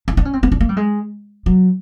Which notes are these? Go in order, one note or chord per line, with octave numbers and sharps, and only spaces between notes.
D#4
D4
C#4
C4
B3
D4
A#3
G3
G#3
F#3